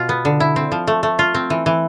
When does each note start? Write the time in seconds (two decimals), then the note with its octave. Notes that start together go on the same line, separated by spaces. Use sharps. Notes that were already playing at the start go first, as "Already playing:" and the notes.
Already playing: B2 F4
0.09 B3
0.25 D3
0.40 E4
0.56 C4
0.72 F3
0.87 A3
1.03 A3
1.19 F4
1.34 C4
1.50 E3
1.66 E3